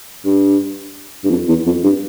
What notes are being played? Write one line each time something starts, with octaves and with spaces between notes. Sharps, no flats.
G2
G2
F2
E2
F2
G2